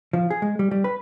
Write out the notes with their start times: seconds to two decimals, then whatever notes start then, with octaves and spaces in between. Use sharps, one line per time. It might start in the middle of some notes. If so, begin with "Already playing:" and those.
0.13 F3
0.30 G#4
0.42 G#3
0.59 G3
0.71 G3
0.84 B4